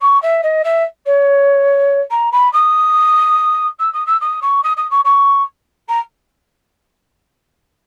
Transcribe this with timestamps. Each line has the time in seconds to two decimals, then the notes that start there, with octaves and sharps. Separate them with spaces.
0.01 C#6
0.22 E5
0.43 D#5
0.64 E5
1.06 C#5
2.10 A#5
2.32 B5
2.53 D#6
3.79 E6
3.93 D#6
4.06 E6
4.20 D#6
4.42 C#6
4.63 D#6
4.77 D#6
4.90 C#6
5.04 C#6
5.88 A#5